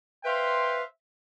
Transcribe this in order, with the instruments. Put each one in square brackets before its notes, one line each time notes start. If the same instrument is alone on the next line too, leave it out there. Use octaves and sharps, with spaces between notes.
[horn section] B4 C5 E5 F5 G5 C6